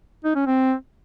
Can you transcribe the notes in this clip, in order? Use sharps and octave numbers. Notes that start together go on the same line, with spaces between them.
D#4
C#4
C4